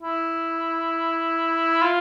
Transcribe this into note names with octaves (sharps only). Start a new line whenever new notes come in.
E4
F4